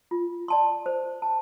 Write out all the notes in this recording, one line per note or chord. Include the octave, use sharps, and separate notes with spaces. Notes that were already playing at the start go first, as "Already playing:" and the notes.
F4
D5 A5 C6
C5
A5